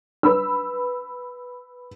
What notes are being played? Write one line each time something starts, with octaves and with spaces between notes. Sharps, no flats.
B4 B5 E6